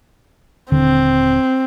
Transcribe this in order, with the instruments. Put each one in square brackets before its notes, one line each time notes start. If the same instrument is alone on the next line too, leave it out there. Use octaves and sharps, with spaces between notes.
[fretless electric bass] D#1 D3 [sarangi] C4